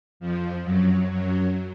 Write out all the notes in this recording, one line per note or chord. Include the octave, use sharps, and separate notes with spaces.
F2 F3
F#2 F#3
F#2 F#3